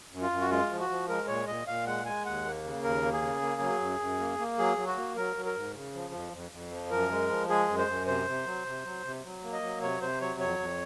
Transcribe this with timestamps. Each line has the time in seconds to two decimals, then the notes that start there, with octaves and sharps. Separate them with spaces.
0.12 F#2
0.22 F4
0.31 F#2
0.41 F#4
0.50 G#3 F4
0.70 F3
0.80 F#4
0.90 F3
1.09 G#3 A#4
1.28 A#2 C#5
1.47 A#2 D#5
1.67 A#2 F5
1.86 G#3 F#5
2.06 G#3 G#5
2.25 D#2 F#5
2.45 A#3
2.64 C#3
2.83 D#2 A#4
3.03 A#3
3.13 G#4
3.22 C#3
3.41 A#3
3.61 F#3
3.81 F#2
4.00 F#2
4.20 A#3
4.39 A#3
4.58 F#3 G#4
4.78 F#3
4.87 F#4
4.97 A#3
5.16 F#3 A#4
5.36 F#3
5.45 A#4
5.55 G#2
5.74 C#3
5.94 F3
6.13 F2
6.33 F2
6.52 F2
6.71 F3
6.91 F#2 A#4
7.11 G#3
7.29 F3
7.49 G#3 G#4
7.68 F#2
7.78 C5
7.88 F#2
8.07 C3 C5
8.27 C3
8.46 F#3
8.66 C3
8.85 F#3
9.05 C3
9.24 F#3
9.43 A#3
9.53 D#5
9.63 F#3
9.82 C3 C#5
10.01 C3 C5
10.21 F#3 C#5
10.40 F2 C#5
10.59 F2